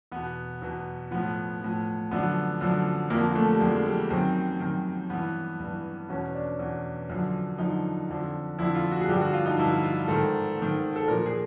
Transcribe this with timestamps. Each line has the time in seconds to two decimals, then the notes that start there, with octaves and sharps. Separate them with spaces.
0.12 E2 B2 B3
0.62 E2 B2
1.11 A2 F3 B3
1.61 A2 F3
2.11 F#2 D3 F3 B3
2.61 F#2 D3 F3
3.10 F2 D3 F3 A#3
3.35 A3
3.53 G3
3.60 F2 D3 F3 G#3
3.76 G#3
3.86 G3
4.10 F#2 D#3 C4
4.60 F#2 D#3
5.10 G2 E3 B3
5.59 G2 E3
6.09 E2 B2 C#4
6.35 D4
6.59 E2 B2
7.09 F#2 D3 F3
7.58 F#2 D3 F3 D#4
8.09 F2 D3 F3
8.59 F2 D3 F3 E4
8.75 F4
8.91 F#4
9.01 G#4
9.08 G2 D3 F3 G4
9.21 F#4
9.33 F4
9.46 D#4
9.58 G2 D3 F3 E4
9.83 F4
10.08 G#2 D#3 A4
10.57 G#2 D#3
10.96 A4
11.08 A#2 A#4
11.11 F3
11.26 G#4